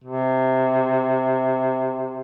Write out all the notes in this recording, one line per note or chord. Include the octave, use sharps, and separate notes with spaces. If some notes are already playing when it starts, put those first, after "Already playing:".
C3